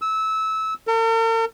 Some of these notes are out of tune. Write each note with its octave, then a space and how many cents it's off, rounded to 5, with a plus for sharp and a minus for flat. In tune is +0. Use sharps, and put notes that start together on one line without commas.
E6 -20
A#4 -45